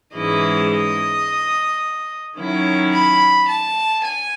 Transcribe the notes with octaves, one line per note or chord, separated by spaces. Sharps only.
G#2 E3 G#3 C#4 E4 D#5
D#5
D#3 F#3 C#4 E4
B5
A5
G#5